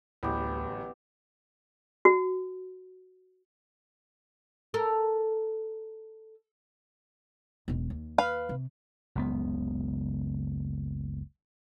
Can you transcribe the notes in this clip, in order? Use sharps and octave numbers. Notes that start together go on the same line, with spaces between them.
D1 A1 D2 B3 G4
F#4
A4 A#4
E1 B1
D#2
B4 F5
C3
F#1 C#2 B3